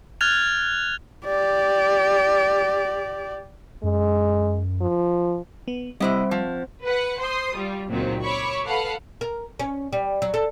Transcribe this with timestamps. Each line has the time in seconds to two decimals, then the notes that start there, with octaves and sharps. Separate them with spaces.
0.21 F6 F#6 G#6 A6 F7
1.26 G4 D5
3.83 F#2 G#3
4.81 F3
5.68 B3
6.00 C3 G3 C4 E4 C5 D#5
6.31 F3
6.84 B4 F#5
7.19 C5 C6 D#6
7.56 G3 F4
7.89 C#2 A#2 D#3 F#3 C4
8.23 C#5 B5 C#6 D6 E6
8.65 A4 B4 F5 F#5
9.21 A#4
9.59 C#4
9.93 G3
10.22 F#3
10.34 A4